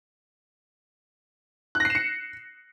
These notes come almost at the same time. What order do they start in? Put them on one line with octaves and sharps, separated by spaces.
F#6 A#6 C7 E7 C#7